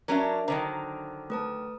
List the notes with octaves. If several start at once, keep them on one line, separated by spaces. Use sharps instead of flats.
F#3 C#4 D4 A#4 E5
D3 D#3 F#3 C5 A#5
A3 B4 A5